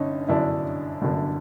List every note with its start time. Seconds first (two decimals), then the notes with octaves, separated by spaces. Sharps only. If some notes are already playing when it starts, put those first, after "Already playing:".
Already playing: G1 D3 C#4 D#4
0.28 G1 F#2 D3 D4 E4
1.02 G1 F#2 D3